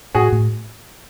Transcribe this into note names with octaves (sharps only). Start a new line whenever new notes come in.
A2 F#4 G#4
A2